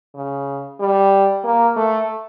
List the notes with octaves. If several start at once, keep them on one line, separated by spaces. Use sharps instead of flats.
C#3
G3
A#3
A3